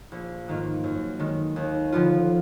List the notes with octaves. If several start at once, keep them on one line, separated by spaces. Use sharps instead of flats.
A#1
G#2 D#3 A#3 F4
F#2
D#3 G#3
D#2
D3 F3 B3 F4